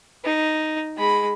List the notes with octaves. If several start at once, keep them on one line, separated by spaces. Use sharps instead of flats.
D#4
G#3 B5